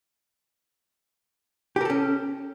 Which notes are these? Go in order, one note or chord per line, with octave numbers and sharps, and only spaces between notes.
C#4 G4 A4 A#4